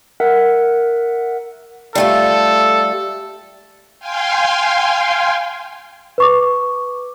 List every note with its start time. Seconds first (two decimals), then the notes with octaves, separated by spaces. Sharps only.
0.20 A#4 E5 F#5
1.95 G3 A3 F4 A4
4.00 F5 G5 G#5 C6
6.18 B4 C#6 D6